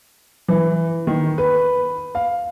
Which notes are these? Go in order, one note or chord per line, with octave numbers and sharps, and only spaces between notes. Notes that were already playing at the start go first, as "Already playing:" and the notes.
E3
D#3
B4
F5